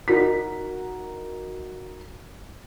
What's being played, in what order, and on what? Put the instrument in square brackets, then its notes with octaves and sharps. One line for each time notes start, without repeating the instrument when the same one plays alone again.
[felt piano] D#4 F#4 A#4 B6